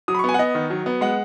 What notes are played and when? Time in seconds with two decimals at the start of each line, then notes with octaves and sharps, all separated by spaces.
0.08 F#3 D#6
0.15 B5
0.19 C#6
0.24 B3 G#5
0.34 F#5
0.39 B3 D#5
0.55 D#3
0.70 F#3
0.86 B3
1.01 G#3 F#5